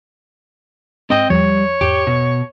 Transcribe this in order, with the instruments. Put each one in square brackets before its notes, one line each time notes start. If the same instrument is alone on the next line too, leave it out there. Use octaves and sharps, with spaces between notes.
[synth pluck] G#2 G#3 [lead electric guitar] C4 G5 [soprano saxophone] D#5
[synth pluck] E2 F3 [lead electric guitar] G3 [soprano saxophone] C#5
[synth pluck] E2 G#2 D7 [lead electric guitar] G4
[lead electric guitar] B2